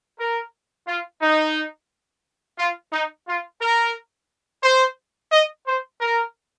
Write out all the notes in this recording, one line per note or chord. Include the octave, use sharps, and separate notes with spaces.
A#4
F4
D#4
F4
D#4
F4
A#4
C5
D#5
C5
A#4